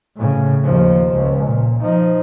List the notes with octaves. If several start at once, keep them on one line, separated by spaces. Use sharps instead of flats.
A2 C#3
D#2 F3
C#2
A#2
F3 D#4